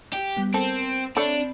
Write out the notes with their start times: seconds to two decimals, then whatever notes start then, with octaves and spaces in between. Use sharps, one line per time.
0.13 G4
0.37 G3 B3
0.54 C4 A4 A#4
1.17 A3 C4 D4 C#5 D5 B5